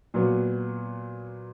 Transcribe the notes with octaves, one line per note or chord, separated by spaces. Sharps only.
A#2 F#3 B3